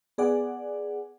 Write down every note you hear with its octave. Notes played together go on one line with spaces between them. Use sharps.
B3 G#4 D5 F#5